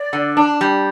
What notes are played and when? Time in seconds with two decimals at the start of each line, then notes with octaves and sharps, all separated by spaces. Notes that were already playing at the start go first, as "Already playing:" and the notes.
Already playing: D5
0.13 D3
0.37 D4
0.61 G3